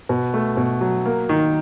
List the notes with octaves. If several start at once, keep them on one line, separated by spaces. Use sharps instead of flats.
B2
A3
B2
F#3
A#3
D#3